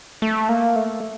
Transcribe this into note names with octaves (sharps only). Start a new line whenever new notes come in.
A3
A#3
A3